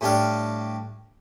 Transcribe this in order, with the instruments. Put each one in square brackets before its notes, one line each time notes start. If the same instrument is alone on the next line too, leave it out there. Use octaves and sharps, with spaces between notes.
[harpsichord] A2 G3 D4 F5